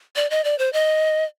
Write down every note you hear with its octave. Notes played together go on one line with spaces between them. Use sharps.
D5
D#5
D5
C5
D#5